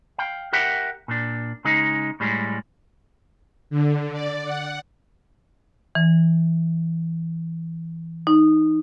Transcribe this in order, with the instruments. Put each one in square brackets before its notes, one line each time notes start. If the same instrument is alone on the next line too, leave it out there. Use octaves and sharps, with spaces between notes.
[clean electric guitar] F5 G5
G4 A#4 E5 F#5 G5
A#2 D4
C#3 G#3 D#4
A2 G3 G#3
[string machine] D3
D5
F#5
[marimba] E3
D#4